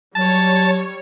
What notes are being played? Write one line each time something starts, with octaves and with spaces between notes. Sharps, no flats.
F#3 G3 C#5 A5